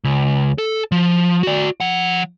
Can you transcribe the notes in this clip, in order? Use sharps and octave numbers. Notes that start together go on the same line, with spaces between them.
C#2
A4
F3
F#4 D5
F3 F#5